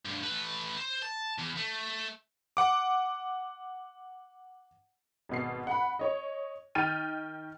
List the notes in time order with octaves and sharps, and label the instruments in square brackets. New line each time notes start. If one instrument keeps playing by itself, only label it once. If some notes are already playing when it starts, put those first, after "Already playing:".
[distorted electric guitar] D2 G2
A3 B4
C5
A5
E2
A3
[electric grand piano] F#5 D6
[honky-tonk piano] G#1 B2 C7
F#5 B5
C#5 D#5
D#3 G5 F6 A6 D#7